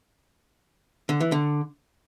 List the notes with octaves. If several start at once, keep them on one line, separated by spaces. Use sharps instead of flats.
D3
E3
D3